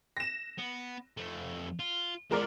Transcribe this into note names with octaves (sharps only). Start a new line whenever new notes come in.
A#6 E7
B3
F2 A3
F4
F3 G#3 B3 A#4 D5